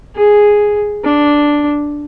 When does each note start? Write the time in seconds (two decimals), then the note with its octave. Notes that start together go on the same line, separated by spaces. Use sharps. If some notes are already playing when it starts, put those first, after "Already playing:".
0.16 G#4
1.04 D4